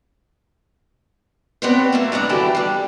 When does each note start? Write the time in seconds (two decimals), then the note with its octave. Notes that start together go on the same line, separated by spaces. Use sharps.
1.62 B3 C4 D4 G4 C5 C#5
1.92 A3 A#3 A4
2.12 G2 D4 F#5 A#5
2.29 D3 E3 F#3 E4 G4 A4
2.55 G3 D4